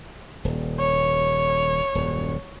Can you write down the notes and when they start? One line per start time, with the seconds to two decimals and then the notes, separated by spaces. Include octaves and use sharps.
0.45 D#1
0.80 C#5
1.95 D#1 F#2